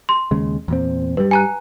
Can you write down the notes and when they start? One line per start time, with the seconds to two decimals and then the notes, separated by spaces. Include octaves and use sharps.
0.09 C6
0.31 D#2 C#3 G#3
0.68 E2 A#2 C4
1.17 G2 G3 B4
1.31 G#5 A#5 F#6